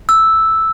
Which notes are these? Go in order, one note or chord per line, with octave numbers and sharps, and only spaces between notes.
E6